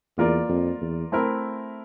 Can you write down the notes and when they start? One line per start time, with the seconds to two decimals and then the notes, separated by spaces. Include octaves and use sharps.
0.18 E2 A#3 F4 A#4 D5
0.49 F2
0.81 E2
1.12 A3 C4 E4 A#4 E5